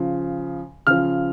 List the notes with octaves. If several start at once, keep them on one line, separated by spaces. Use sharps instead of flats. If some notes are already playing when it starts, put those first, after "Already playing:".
Already playing: C#3 F3
C#3 F3 F6